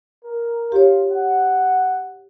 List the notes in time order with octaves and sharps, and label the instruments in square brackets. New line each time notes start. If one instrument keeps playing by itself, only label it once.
[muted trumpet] A#4
[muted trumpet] F4 [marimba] G4 C#5
[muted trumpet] F#5